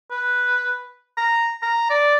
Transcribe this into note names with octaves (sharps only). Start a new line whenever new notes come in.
B4
A#5
A#5
D5